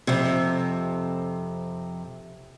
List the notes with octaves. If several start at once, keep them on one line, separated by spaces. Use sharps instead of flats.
F2 C3